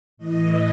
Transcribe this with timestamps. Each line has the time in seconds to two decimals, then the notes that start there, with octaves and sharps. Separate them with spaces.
0.17 A2 E3 D#5